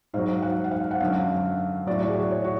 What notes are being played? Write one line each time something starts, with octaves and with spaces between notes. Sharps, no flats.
G#2 F#3 F5
F#5
F5
F#5
F#5
F#2 D3 F#3 F5
A2 F#3 D5
F#4
G#4
C#5
F#4